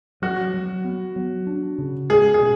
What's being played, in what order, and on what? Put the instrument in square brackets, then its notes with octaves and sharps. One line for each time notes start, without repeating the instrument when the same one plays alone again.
[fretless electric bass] F#3 [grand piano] F#4
[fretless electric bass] F#3
B3
F#3
D4
C#3
[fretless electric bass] G#3 [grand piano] G#4
[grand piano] G#4
[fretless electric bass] B2